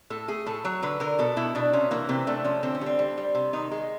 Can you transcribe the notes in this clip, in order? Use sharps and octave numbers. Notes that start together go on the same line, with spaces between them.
A2 A4
A3 G#4
A2 A4
F#3 C#5
D3 B4
D3 A#4
B2 A4
B2 E4
B2 D4
C3 C#4
E3 A#3
C3 C4
A3 D4
F3 C#4
D3 C4
C#4
G3 C4
G3
G3
C3
D#3 D#4
G#3 D#4